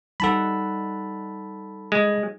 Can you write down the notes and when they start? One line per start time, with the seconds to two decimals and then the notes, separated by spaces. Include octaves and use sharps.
0.20 G3 D#4 A4 F#5 A5 B5
1.92 G#3